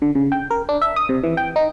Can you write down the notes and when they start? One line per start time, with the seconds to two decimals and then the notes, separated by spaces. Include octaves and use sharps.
0.02 D3
0.15 C#3
0.32 G5
0.51 A#4
0.69 D4
0.82 E5
0.96 D#6
1.09 C3
1.23 E3
1.37 G5
1.56 D#4